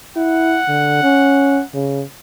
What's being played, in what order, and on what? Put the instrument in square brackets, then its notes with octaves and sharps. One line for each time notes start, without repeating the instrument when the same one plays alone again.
[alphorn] E4 [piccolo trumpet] F#5
[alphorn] D3
C#4
C#3